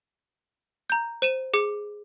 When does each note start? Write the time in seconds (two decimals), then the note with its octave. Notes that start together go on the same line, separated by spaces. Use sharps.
0.90 A#5 G6
1.22 C5 D#7 E7
1.54 G#4 D6 C#7